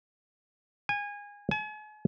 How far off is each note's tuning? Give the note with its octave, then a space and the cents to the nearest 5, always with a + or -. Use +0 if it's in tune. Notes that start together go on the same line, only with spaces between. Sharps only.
G#5 -25
G#5 +40